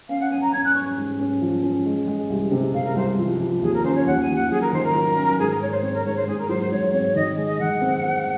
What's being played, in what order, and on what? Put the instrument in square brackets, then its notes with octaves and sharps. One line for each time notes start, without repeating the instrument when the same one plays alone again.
[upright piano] C#4 [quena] F5
[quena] F#5
[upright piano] C#4 [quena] G#5
[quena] A#5
[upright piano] C#4 [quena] G#6
[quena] F#6
[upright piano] C#4 [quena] C#6
[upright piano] G#2
C#4
F3
C#4
G#3
G#3
C2
C3
[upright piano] C3 [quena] F5
[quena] A#4
[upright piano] C2 [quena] C5
[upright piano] F3
F3
[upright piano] D#2 [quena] G#4
[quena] A#4
[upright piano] C#4 [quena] C5
[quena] C#5
[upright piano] D#2 [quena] F#5
[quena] G#5
[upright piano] D#2
[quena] F#5
[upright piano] F#3 [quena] G#4
[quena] A#4
[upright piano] D#3 [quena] C5
[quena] A#4
[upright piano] F#3
C#4
[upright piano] G#2 [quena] G#4
[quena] A#4
[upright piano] G#2 [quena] C#5
[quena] C5
[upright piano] C4 [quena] C#5
[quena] A#4
[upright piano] G#2 [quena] C#5
[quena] C5
[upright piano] G#2 [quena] G#4
[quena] A#4
[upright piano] F#3 [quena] C5
[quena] C5
[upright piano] G#2 [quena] C#5
[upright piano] C4 [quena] C#5
[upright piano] D#3 [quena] D#5
[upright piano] G#3
[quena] D#5
[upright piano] D#3 [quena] F#5
[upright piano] C4
C4